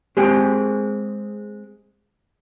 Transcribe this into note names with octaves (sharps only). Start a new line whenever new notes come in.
G#3 C4 G4 G#4